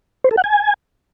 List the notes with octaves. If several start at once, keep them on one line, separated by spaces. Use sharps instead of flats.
C5
A4
F#5
G#5